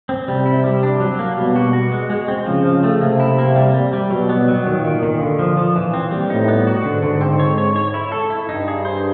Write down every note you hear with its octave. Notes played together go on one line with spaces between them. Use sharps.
C4
C3 G3
E4
G3
D4
F#3
A#3
B2 G3
F#4
F#4
G#3
G#3
C4
C#3 F3
F3
A3
C3 A#3
E4
A#3
G3
G3
G3
B2 F#3
B3
F#3
A#2 D#3
D#3
D#3
D3
F3
F3
A#2 E3
C4
G3
A2 D#4
B3
F#4
G#2 D3
D3
C4
C#5
C#5
C#5
E4
A4
E4
G2 D#4
G#4
C5